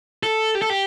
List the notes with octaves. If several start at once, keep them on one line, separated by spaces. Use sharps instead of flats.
A4
G4
A4
G4